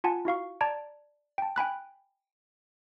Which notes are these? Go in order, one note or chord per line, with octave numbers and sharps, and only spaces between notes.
F4 F#5 G#5 A5
E4 F#4 F5 C#6
D5 A5 A#5 G#6 D7
G5 A5
G5 G#5 B5 F#6